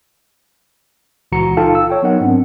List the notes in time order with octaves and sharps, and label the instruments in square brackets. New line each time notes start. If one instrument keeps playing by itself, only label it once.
[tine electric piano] C#2 A#2 E3 F#4 A#5 C#7
D#4 F4 A4 F5 G5 A5
E6
C#5 G5
F#3 B3 D#4 A#4 D#5 F#5
G#2 C4 D4